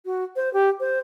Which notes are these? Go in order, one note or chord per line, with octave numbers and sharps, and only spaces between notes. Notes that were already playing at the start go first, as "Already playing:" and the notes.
F#4
C5
G4
C5